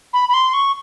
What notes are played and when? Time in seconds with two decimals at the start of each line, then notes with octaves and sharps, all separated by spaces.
0.13 B5
0.29 B5
0.34 C6
0.53 C#6